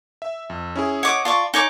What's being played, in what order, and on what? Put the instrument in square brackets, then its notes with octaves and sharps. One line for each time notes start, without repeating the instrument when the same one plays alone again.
[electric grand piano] E5
F2
C#4 E4 G#4
[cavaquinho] C#5 D6 D#6 [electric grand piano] D#5 F#5
[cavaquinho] F4 D5 C#6 [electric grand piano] A5
[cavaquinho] D#4 C#5 D6 [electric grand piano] G#5